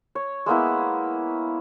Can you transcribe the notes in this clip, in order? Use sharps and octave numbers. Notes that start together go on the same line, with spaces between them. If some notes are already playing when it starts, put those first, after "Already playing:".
C#5
G#3 A#3 B3 E4